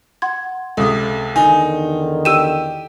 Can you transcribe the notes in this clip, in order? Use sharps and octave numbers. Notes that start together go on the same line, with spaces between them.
F#5 C6 G#6
C#2 C3 A4 D#6
E2 D3 D#3 D#4 G#5
G4 E6 D#7 E7